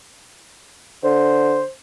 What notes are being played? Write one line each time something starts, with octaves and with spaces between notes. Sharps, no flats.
D3 C5